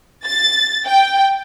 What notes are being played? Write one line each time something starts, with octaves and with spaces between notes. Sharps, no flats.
A6
G5